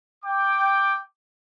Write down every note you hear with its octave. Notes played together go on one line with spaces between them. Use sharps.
G5 D6